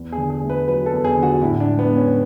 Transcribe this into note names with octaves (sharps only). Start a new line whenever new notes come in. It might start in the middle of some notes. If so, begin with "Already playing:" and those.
Already playing: E2
G#4
D3
G#4
A3
B4
F#3 B4
A4
E2
G#4
D3
F#4
A2 E4
D4
G#3
B3
G#3
C#4